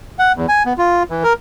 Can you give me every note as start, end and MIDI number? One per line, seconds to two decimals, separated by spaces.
0.19 0.32 78
0.36 0.46 40
0.48 0.63 80
0.65 0.73 59
0.78 1.03 65
1.10 1.24 52
1.24 1.33 70